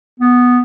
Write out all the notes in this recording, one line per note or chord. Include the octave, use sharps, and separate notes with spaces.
B3